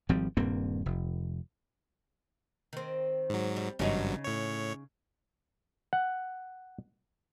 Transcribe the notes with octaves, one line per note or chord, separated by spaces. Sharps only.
G#1 F3 G3 C4
D#1 G2 A#3 C4
F1
D#3 C4
G#2 F#3
G3
G#1 G2 C#3 F#3 C#4 D#4
A2 C#5
F#5